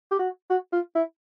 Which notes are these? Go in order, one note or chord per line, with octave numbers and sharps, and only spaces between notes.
G4
F#4
F#4
F4
E4